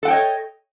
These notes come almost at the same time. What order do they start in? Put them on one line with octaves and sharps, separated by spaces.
A4 F#5 G5 C#5 D#5